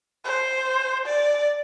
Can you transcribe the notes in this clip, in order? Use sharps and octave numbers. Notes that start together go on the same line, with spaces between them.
C5
D5